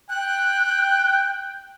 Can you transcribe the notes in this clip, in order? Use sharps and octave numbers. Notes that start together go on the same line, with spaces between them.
G5 F#6